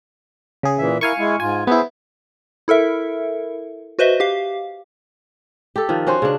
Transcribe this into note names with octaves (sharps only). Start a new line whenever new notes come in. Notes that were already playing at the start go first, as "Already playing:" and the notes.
C#3 G#4
A#2 E3 E5
E4 A#4 F5 G#5 C#6
G#3 E4
G#2 F4 G#5
B3 E4 G#4 C5 E5
E4 A4 A#4 E5
F#4 B4 C5 D#5 E5
G4 F5
G4 A4
D#3 F3 D4
C#4 F#4 C5
C#3 D4